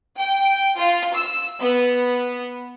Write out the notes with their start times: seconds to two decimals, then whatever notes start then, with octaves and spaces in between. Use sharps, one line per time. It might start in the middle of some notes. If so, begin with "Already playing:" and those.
0.18 G5
0.79 F4
1.15 E6
1.60 B3